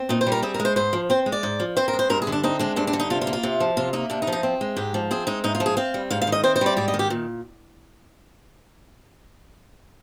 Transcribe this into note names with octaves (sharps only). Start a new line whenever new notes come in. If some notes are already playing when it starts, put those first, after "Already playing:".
Already playing: C4
A#2 D#4
C5
G3
A#4
C4 G#4
A#4
G#3
C5
G#2 C5
F3
C4 C5
G#3
D5
G#2
F3
C4 C5
A#4
G#3
C5
G2 A#4
G#4
D3
D4
C4 D#4
G#3 D4
G2 D4
D4
D3
D#4
C3 F4
F4
A#3
F4
C3
F3
C3 F4
A#3 D#4
C3 D4
D#4
F3
D#4
C4
G#3
G#2 G4
F3
C4 G#4
G#3 D#4
G#2 D#4
F4
F3
G#4
C4 F5
G3
G#2 F5
F5
D#3
D#5
C4 C5
C5
G3 D5
G#2 D5
D#5
D#3
G4
A#2